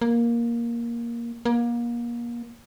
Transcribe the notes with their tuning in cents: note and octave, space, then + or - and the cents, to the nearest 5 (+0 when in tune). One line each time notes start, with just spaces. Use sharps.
A#3 +10
A#3 +30